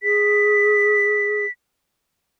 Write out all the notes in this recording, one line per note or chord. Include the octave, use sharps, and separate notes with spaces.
G#4 B6